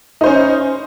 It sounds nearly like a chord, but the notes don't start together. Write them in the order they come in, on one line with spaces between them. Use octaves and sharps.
D#4 C5 C#4